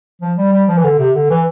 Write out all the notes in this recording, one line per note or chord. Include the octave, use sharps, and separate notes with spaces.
F3
G3
G3
F3
E3
D3
C3
D3
E3